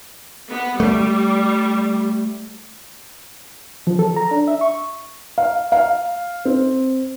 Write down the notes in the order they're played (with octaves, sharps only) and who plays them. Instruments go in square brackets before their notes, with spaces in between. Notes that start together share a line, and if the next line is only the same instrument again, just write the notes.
[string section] B3
[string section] G3 [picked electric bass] A3
[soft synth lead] F3
A4
A#5
D4
E5
C#6
[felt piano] F5
F5
C4